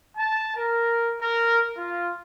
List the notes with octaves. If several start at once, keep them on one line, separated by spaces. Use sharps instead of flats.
A5
A#4
A#4
F4